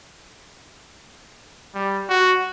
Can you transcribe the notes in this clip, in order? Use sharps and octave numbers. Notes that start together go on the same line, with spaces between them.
G3
F#4